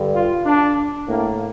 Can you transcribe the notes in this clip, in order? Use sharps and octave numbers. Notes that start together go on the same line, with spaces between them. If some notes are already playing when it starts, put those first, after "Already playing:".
Already playing: G2 D3
F4
D4
A2 A#3